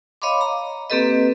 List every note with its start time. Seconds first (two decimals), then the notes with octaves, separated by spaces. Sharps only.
0.22 C#5 D#5 F5 B5 C6 D6
0.41 A#5
0.90 A#3 C4 G4 A4 B4 D#5